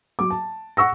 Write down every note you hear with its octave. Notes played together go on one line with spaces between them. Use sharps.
F#3 D6
A5
F#5 C#6 E6 A#6